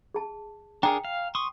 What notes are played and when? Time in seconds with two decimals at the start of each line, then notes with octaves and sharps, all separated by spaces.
0.14 G#4 A5
0.83 D4 G#4 A#4 G5 A#5
1.05 F5
1.35 C6 C#6 D#6